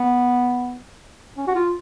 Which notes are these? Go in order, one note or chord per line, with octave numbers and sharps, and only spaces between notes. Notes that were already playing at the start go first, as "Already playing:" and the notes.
Already playing: B3
C#4
F#4
F4